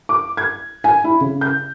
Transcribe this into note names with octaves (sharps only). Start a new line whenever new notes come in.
D6
G#6
G#5
E4
C#3
G6